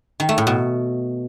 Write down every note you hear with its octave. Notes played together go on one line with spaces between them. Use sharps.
D#3
A3
A2
B2